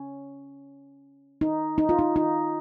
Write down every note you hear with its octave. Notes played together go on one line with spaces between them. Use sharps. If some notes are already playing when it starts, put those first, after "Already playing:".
Already playing: C#4
D#4
D#4
F4
D#4
D#4